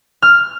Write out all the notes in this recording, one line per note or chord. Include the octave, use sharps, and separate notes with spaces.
F6